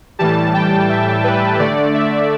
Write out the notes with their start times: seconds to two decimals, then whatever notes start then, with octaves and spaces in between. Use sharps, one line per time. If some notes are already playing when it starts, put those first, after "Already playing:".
0.19 A2 E3 G3 A5
0.54 G5
0.89 E5
1.24 B4
1.59 D3 A3 D5
1.94 E5